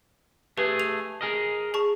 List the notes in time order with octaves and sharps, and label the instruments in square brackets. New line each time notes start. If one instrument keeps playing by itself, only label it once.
[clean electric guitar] A3 G#4 [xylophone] G4 B4
[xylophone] F7
[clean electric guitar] G#4 A#4 D#5
[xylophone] G#4 A5 C#6